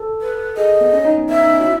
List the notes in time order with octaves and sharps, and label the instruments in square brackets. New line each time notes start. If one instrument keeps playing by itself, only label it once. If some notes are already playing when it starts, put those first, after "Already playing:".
Already playing: [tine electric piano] A4
[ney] B4
[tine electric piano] G#4 [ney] D#5
[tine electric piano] B3
C#4
D#4
B3
[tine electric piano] B3 [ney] E5
[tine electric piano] D#4
C#4
F#4
E4